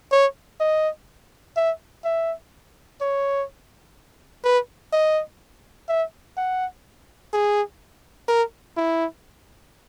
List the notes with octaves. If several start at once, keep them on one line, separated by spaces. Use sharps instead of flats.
C#5
D#5
E5
E5
C#5
B4
D#5
E5
F#5
G#4
A#4
E4